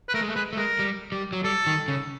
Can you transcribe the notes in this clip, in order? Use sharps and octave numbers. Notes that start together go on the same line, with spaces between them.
B4
A3 A#4
G#3
A3
G#3 B4
A3
G#3 A#4
G3
G3
F#3
G3 A4
D#3
C#3